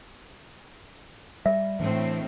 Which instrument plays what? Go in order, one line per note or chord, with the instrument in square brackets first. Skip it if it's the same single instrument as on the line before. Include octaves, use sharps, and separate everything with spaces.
[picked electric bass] G3 [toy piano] E5
[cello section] A2 C4 [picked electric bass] E3 D4